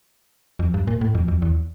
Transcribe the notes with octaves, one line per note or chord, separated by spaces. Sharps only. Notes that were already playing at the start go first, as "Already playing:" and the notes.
F2
G2
A#2
A2
F2
F2
E2